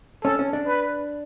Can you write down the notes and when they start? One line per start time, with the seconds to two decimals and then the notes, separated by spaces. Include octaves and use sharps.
0.24 C#4 A4
0.39 C#4
0.53 D4
0.68 B4